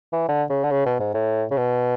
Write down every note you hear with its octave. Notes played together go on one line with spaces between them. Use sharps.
E3
D3
C#3
D3
C#3
B2
G#2
A2
C#3
B2